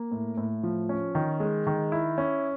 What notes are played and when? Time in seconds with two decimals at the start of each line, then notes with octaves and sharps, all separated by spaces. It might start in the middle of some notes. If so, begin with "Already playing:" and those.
Already playing: A#3
0.12 A2
0.38 A2
0.63 F3
0.89 C#4
1.15 D#3
1.40 G#3
1.67 D#3
1.92 E4
2.18 C#4